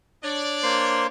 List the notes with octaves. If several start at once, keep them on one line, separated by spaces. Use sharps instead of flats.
D4 C#5 D5
A#3 C5 C6